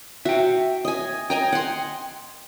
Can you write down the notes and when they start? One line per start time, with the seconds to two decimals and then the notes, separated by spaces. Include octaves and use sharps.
0.25 F#4 E5 G5
0.85 D#5 G#5
1.30 D#5 G5 G#5 A#5
1.52 F#5 C6